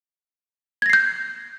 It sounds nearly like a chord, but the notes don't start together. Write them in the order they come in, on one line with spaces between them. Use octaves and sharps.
G#6 A#6 C7 G6